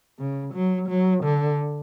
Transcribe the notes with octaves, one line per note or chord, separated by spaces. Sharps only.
C#3
F#3
F#3
D3